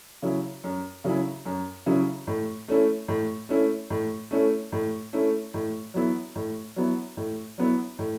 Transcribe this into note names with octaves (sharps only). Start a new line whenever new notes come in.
C#3 F#3 C#4 E4
F#2
C#3 F#3 C#4 E4
F#2
C#3 F#3 C#4 E4
A2
A3 C#4 E4
A2
A3 C#4 E4
A2
A3 C#4 E4
A2
A3 C#4 E4
A2
F#3 B3 E4
A2
F#3 B3 E4
A2
F#3 B3 E4
A2